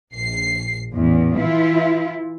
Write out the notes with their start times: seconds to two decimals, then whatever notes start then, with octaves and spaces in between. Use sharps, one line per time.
0.13 A#1 C7
0.91 A1 E2
1.36 E3 E4 F4